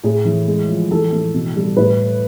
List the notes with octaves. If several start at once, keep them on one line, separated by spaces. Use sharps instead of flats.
A2 G#4
E3
G#3
F3
E3 A4
A3
B2
G3
A2 B4